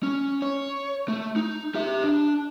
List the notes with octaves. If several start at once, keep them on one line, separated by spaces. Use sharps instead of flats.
C#4
C#5
A3
D#4
G4 E5
D4